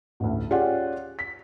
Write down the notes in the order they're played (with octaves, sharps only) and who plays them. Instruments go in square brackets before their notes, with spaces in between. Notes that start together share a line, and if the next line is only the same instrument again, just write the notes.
[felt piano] A1 D2
C#4 F4 G4 G#4 D5 F#5
B6